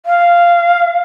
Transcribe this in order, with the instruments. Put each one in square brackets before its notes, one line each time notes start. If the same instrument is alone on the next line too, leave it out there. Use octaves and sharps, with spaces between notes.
[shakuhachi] F5